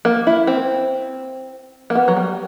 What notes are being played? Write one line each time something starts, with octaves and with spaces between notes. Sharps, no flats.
A#3
E4
C4
A#3
B3
F#3
G3